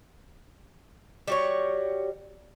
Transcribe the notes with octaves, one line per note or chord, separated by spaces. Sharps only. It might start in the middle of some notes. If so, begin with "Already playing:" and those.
G3 F#4 C#5